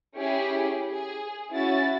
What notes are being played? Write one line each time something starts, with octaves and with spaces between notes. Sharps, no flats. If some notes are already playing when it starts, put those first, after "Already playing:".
C#4 E4 G4 G#4
G#4
C#4 E4 F#4 A6